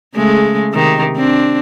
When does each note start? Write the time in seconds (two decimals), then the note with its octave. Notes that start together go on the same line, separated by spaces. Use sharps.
0.15 C#3 G#3 A3
0.72 C3 D#3
1.17 C4 D4